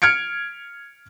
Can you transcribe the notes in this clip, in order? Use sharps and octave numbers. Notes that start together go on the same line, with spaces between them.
F6 G#6 C#7 D7